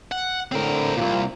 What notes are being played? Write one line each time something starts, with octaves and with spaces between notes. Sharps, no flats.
F#5
A2 D3 C4 A#4
C2 A#2 A#3 C4 F4